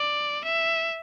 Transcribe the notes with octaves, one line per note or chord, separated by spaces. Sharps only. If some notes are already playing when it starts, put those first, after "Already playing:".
Already playing: D5
E5